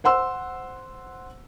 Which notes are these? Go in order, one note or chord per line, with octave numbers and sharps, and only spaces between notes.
C5 F#5 C6 E6